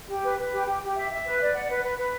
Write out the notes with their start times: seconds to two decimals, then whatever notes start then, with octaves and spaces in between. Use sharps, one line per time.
0.09 G4
0.23 B4
0.38 B4
0.53 G4
0.67 G4
0.82 G4
0.96 E5
1.11 E5
1.26 B4
1.41 D5
1.55 F#5
1.69 B4
1.84 B4
1.98 B4